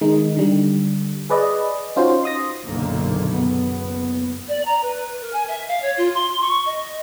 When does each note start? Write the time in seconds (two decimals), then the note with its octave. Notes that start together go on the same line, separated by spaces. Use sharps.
0.01 D#3 G#3 D#4
0.37 D3 G3
1.30 G#4 B4 D5 D#5
1.96 C#4 D#4 F4 F#4 C5
2.23 C6 D#6 A#6
2.64 F#1 B1 A#2 D3 D#3 A#3
3.30 F#1 F#2 B3
4.48 D5
4.65 A#5
4.82 B4
5.21 A#4
5.33 G#5
5.48 E5
5.68 F5
5.82 C#5
5.97 F4
6.14 C6
6.41 C#6
6.66 D#5